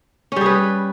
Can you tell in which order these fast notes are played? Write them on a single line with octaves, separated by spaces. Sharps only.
C#4 G3 G#4 B4